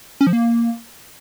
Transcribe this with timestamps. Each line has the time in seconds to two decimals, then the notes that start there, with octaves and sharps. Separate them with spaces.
0.21 C#4
0.27 F3
0.33 A#3